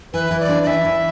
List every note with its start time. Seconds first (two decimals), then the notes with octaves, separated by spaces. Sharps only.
0.13 E3 B4
0.31 E3
0.40 D5
0.49 D4
0.63 D5
0.67 E3 E5
0.85 E3